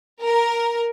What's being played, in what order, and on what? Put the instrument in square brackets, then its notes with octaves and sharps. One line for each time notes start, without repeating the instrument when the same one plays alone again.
[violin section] A#4